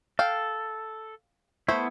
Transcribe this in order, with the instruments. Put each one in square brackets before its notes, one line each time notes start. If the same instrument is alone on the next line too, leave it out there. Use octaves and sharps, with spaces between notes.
[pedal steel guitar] A4 [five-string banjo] F5 G5
[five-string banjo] A3 C5 [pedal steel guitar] B3 E4